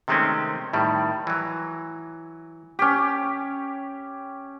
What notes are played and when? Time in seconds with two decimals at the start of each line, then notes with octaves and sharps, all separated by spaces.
0.08 C3 D#3 G#3 A3 C4 C#4
0.73 A2 D#3 G3
1.27 E3 F#3
2.79 C#4 G4